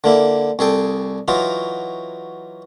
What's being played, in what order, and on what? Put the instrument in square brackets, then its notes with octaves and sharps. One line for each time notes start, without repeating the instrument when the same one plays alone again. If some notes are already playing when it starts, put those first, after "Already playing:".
[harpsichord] D3 A#3 E4
C2 G#4 A4 G5
E3 F#3 D#4 F4